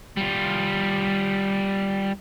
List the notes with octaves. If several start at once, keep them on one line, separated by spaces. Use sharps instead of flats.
G3 F4